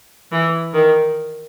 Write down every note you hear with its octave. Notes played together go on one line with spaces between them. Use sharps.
E3
D#3